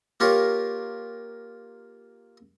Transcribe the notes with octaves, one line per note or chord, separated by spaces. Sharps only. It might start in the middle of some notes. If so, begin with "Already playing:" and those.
A#3 F4 G4 A#4 C#5